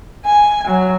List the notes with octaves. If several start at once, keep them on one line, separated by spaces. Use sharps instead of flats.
G#5
F#3